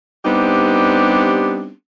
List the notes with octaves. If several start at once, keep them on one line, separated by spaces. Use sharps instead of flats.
G3 B3 C4 D4 D#4 G4